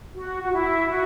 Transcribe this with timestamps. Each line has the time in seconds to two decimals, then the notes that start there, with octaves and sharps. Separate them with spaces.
0.15 F#4
0.43 F#4
0.52 E4
0.90 F#4